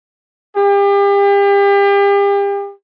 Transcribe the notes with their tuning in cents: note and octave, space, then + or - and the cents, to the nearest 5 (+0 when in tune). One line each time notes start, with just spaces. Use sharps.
G4 +40